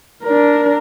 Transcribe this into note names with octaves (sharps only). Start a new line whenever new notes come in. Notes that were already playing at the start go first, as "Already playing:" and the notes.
D4 A#4